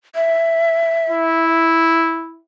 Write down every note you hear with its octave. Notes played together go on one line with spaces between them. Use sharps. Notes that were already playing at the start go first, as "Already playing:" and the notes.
E5
E4